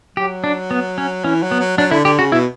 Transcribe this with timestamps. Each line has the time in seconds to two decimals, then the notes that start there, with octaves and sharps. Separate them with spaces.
0.17 F#3 G4
0.44 D4
0.71 B3
0.98 C#4
1.24 E3 C#4
1.42 F#3
1.51 B3
1.60 F#3
1.78 F#3 D4
1.91 D3 E4
2.05 D3 G4
2.19 C#3 F#4
2.32 B2 E4